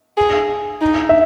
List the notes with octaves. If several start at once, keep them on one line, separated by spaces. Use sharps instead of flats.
G#4
D#4
E5